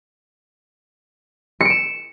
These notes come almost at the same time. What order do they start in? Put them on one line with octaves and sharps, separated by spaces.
C#7 D7 E7